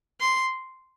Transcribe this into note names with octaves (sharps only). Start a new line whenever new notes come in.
C6